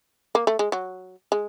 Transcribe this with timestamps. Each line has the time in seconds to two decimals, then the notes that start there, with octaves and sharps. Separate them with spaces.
0.35 A#3
0.47 A3
0.59 G#3
0.72 F#3
1.32 G#3